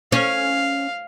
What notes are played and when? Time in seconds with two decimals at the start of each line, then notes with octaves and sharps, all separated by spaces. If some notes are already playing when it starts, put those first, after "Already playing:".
0.12 C#4 F5